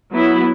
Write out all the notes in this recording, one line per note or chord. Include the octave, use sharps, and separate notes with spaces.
F#3 B3 E4